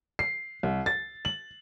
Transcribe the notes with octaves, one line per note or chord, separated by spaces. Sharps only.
C7
C2
A6
F#7